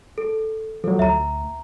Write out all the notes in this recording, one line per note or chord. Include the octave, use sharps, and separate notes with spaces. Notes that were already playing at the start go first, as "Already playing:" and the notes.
A4
F3 F#3 A4
D2 E5 A#5